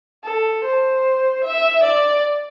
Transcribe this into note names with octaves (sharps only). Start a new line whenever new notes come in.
A4
C5
E5
D5